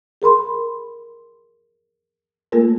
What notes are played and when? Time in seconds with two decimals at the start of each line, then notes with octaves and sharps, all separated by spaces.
0.22 G#4 A#4 B5 C6
2.52 A3 A#3 F4 A4 A#4